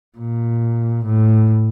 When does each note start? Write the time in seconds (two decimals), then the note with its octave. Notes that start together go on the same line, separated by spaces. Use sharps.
0.18 A#2
1.06 A2